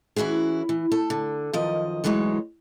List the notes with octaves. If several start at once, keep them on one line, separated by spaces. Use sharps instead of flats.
E3 C#4 E4 F#4 G#4
E3
A4
D3
F#2 D#3 F3 D#5
D2 E3 F#3 G#3 D#4 C#5